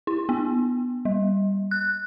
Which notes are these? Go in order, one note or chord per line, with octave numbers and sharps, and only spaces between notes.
E4
B3
G3
F#6